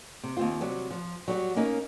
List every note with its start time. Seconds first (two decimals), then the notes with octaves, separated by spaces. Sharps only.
0.23 C3
0.37 D#2 C4 F4
0.61 C3 F#3 G3
0.91 F3
1.28 F#3 G3 F#4
1.56 A#3 C#4 D#4